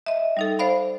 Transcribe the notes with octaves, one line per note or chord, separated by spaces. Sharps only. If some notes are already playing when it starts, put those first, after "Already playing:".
D#5 E5
G3 D#4 A4
C5 D5 F5 B5